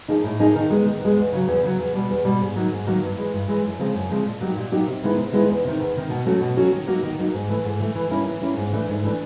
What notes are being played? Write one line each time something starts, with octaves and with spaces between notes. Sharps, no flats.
F3 A#3 D#4 G#4
A2
F3 A#3 D#4 G#4
D#3
G#3 B3
D#3
G#3 B3
E2
C#3 F#3
E2
C#3 F#3
E2
B2 G3
E2
B2 G3
G#2
D#3 F#3 A#3
G#2
D#3 F#3 A#3
G2
E3 G#3
G2
E3 G#3
F#2
C#3 F3 G#3 C4
F#2
C#3 F3 G#3 C4
A#2
F#3 A#3 D#4 G4
A#2
F#3 A#3 D#4 G4
C3
D#3 G#3 B3 E4
C3
D#3 G#3 B3 E4
E2
C3 D#3
E2
C3 D#3
B2
F#3 A3 C#4 F#4
B2
F#3 A3 C#4 F#4
D#3
F#3 A#3 D#4 F#4
D#3
F#3 A#3 D#4 F#4
G#2
E3 A3
G#2
E3 A3
E3
G3 A#3 C#4 E4
E3
G3 A#3 C#4 E4
G#2
E3 A3 D4
G#2
E3 A3 D4